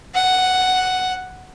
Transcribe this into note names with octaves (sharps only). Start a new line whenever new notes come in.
F#5